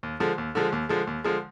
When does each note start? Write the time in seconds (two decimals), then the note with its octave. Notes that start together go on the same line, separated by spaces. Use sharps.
0.03 D#2
0.20 D3 F3 G#3
0.38 D#2
0.55 D3 F3 G#3
0.72 D#2
0.89 D3 F3 G#3
1.07 D#2
1.24 D3 F3 G#3